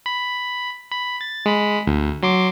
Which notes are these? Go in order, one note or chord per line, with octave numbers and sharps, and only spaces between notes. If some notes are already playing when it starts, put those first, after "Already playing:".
B5
B5
A6
G#3 B5
D2
F#3 C6 D6